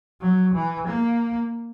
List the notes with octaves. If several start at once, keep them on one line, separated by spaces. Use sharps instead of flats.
F#3
E3
A#3